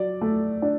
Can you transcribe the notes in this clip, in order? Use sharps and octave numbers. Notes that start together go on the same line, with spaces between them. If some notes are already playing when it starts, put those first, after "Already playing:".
Already playing: F#3 D5
A3
D4